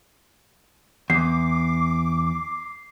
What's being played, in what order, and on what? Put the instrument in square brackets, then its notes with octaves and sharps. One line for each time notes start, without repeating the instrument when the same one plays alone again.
[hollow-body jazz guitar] E2 [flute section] D6 [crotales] C7